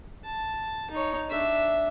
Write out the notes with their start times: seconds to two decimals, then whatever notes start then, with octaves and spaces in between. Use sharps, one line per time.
0.25 A5
0.91 D#4 C#5
1.29 D4 E5